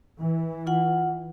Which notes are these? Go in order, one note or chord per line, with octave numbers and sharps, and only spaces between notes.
E3
F4 F#5